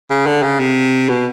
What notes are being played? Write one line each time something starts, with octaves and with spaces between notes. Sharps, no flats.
C#3
D3
C#3
C3
B2